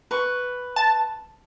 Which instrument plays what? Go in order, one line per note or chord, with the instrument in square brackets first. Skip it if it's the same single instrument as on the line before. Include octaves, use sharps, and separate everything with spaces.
[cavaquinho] B4 C#6
[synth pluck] A5